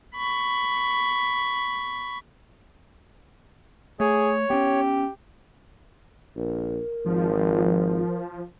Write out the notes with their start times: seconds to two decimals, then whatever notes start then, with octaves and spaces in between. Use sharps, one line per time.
0.15 B5 C#6
4.00 A3 G#4 C#5
4.50 B3 C#4 G4
6.36 A#1 A#4
7.06 G#1 F3